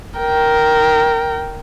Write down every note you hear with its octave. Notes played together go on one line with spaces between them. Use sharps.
A#4 G5